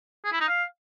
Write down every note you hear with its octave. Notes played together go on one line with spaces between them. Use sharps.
G#4
E4
D#4
F5